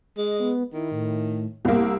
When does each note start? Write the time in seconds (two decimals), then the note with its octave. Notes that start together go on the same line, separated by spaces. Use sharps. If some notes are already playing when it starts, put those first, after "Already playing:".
0.17 G#3 D#5
0.40 B3
0.73 D#3 E4
0.92 A2
1.65 C2 A#3 E6